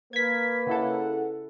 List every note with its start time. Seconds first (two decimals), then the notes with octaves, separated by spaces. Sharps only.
0.13 A#3 A#4 B4 G#6 B6
0.67 C#3 E4 A4 F#5